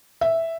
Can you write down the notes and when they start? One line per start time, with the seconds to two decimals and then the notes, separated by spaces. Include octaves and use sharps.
0.21 E5